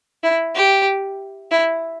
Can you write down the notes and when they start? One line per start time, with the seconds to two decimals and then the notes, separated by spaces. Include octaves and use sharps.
0.23 E4
0.55 G4
1.51 E4